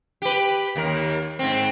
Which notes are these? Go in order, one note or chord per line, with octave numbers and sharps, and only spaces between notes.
G4 B4
D#2 A#4
G#2 C4